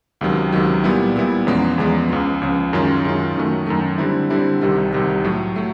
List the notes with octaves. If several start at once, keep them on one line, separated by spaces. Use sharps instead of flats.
C#2 C3 D#3 F#3
C#2 C3 D#3 F#3
A#2 G3 B3 E4
A#2 G3 B3 E4
E2 C#3 F3 G#3 B3
E2 C#3 F3 G#3 B3
C#2 C#3 F3
C#2 C#3 F3
F#2 D#3 G#3 C#4 F4
F#2 D#3 G#3 C#4 F4
F#2 D#3 F#3 A3
F#2 D#3 F#3 A3
D3 G3 C4 E4
D3 G3 C4 E4
C2 C3 D#3 G3
C2 C3 D#3 G3
A2 F#3 A3
F#3 A3